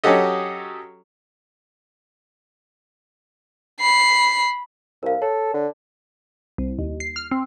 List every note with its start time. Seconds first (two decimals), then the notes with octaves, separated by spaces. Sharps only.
0.04 F#3 C#4 F#4 G4 A4 D#5
3.80 B5 C7
5.03 C2 A#4 F5
5.22 A4 C#5
5.54 D3
6.58 C2
6.79 D#2
7.00 C7
7.16 F6
7.31 C4